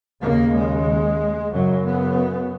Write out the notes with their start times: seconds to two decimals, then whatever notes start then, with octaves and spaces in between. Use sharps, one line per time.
0.21 D#2 C#3 A#3
0.53 G#3
1.52 F#2 C#3 F#3
1.84 B3